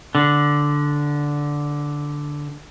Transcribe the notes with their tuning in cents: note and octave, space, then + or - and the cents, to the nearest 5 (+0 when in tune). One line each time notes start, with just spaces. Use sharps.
D3 -5